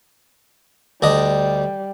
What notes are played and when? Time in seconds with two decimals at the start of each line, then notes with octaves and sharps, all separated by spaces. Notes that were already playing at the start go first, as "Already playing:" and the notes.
1.02 D2 G3 D4 D#5